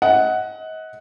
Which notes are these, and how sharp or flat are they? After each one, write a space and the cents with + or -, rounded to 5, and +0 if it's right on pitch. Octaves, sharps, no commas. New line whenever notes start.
D#5 +35 F#5 +0